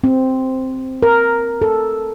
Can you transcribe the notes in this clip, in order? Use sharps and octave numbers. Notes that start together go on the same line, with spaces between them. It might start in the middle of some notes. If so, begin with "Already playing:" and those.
C4
A#4
A4